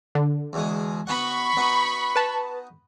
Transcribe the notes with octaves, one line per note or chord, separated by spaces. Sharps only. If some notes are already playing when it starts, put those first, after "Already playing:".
D3
E2 B2 G#3
B3 F#4 F#5 B5 C#6
B3 D#4 F#4
B4 A5